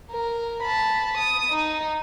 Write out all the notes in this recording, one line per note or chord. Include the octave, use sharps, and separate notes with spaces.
A#4
A5 B5
D#6
D#4